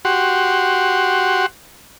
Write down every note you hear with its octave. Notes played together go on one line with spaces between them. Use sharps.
F#4 G4 F#5 C6